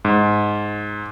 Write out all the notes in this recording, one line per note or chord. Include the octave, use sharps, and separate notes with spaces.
G#2